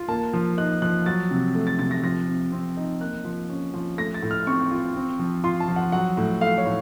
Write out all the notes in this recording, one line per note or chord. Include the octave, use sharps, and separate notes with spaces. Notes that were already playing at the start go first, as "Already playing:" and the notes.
Already playing: F4
A#3 A5
F3
D#4 F#6
F3 F#6
F#3 A6
C3
A3
A6
C3 A6
A#6
F3 A#6
C3
C4
D#4
A#3 F#6
F3
C#4
F3
A3 A#6
A6
A2
F6
C4 C#6
F4
C4
F3
F4 C6
A5
F3
F#5
F#3 F#5
A2
A3 F5
C#5
A2